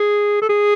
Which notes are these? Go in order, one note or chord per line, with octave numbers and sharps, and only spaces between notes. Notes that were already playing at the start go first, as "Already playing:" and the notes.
Already playing: G#4
A4
G#4